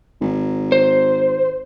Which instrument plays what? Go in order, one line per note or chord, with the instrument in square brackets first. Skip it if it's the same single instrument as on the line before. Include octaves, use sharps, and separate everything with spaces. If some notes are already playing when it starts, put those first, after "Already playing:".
[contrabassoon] G#1
[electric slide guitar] C5